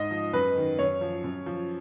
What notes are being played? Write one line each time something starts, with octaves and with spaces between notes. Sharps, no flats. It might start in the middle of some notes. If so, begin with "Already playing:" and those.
Already playing: G#2 D#5
F3
F#2 B4
D#3
F#2 C#5
F3
F#2
F3